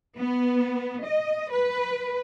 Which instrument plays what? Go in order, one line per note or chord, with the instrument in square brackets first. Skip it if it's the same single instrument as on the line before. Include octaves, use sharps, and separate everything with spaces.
[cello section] B3
D#5
B4